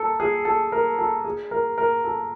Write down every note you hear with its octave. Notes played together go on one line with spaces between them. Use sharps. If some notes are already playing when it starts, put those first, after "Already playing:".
Already playing: A4 A#4
G#4
A4
A#4
A4
G#4
A#4
A#4
A4